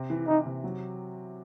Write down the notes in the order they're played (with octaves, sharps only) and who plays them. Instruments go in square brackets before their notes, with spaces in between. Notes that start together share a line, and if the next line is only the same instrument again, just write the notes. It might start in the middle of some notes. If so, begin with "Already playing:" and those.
Already playing: [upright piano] C3
E3
[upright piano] E3 [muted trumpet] D#4
[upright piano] C3
F#3